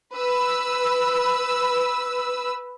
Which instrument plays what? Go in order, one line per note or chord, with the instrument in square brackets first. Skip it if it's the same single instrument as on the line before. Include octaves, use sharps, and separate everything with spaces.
[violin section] B4 E6